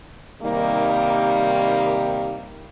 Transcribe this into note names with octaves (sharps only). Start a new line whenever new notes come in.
C3 D#3 G3 A#3 D#4